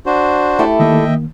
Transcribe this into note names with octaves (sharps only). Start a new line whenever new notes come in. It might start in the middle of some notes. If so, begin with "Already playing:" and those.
D4 F#4 C5
A3 E4 G4
D#3 A#3 D#5 E5 G5